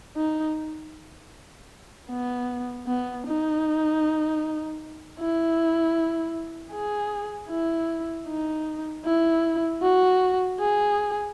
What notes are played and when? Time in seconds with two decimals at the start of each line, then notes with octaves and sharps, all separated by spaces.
0.16 D#4
2.09 B3
2.87 B3
3.26 D#4
5.19 E4
6.72 G#4
7.50 E4
8.27 D#4
9.05 E4
9.82 F#4
10.60 G#4